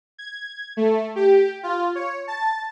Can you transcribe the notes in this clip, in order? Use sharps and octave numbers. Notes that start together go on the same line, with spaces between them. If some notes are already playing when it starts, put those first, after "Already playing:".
G#6
A3
G4
F4
C#5
A5